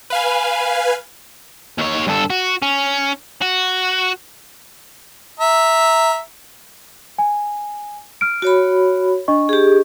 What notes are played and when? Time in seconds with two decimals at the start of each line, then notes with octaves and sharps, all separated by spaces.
0.10 B4 F5 G#5
1.78 D#2 C#5
2.07 G2 A4
2.30 F#4
2.63 C#4
3.42 F#4
5.40 E5 A#5
7.18 G#5
8.21 F6 D7
8.42 F#4 C#5 B5
9.28 D4 D#5 C#6
9.49 G4 G#4